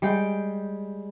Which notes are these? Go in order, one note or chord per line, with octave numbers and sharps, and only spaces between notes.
G3 G#3 G5